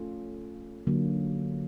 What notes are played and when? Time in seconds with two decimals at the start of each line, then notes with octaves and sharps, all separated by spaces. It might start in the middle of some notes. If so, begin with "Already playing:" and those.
Already playing: A3 C#4 F4 A4
0.87 D3 F#3 A#3